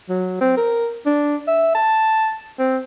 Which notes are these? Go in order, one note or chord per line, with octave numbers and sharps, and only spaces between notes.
F#3
C4
A#4
D4
E5
A5
C4